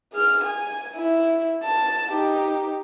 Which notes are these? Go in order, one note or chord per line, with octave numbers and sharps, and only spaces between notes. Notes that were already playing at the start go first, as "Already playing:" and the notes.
G#4 F6
G#5
E4
A5
D#4 G4